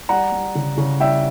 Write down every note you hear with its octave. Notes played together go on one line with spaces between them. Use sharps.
G3 F#5 A#5
G3
C#3
C#3
G3 E5 G5